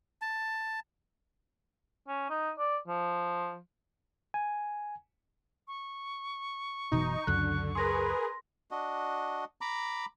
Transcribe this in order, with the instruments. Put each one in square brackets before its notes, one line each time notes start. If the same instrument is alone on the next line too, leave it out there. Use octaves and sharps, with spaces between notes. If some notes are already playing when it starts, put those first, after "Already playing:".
[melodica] A5
[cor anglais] C#4
D#4
D5
F3
[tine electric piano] G#5
[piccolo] C#6
[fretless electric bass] F#1 B2 E3 [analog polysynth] D#4
[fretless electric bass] C#2 F#2 [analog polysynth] D3 [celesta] F#6
[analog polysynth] G#4 A#4 B4 [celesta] C6 A#6
[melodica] D4 F#4 D#5
A#5 B5 D6